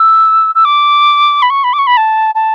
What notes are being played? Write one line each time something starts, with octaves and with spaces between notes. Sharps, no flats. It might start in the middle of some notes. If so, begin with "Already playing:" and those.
Already playing: E6
E6
D6
B5
C#6
B5
D6
C#6
B5
A5
A5